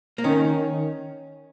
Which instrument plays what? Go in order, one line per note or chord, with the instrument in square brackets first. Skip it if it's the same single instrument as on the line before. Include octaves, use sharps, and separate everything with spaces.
[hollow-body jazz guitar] A#3
[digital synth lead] D#3 [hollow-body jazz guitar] C#4